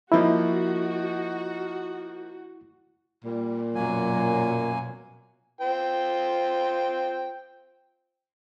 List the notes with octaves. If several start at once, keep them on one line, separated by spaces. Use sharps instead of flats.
F3 A#3 D#4 E4 F#4
A#2 G3
F#2 B2 F#3 A#3 G#5
F4 C5 G5